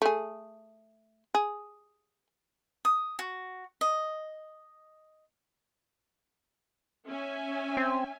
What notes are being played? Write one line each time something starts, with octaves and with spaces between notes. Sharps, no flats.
A3 G#4
G#4
D#6
F#4
D#5
C#4 E5 G#5
C4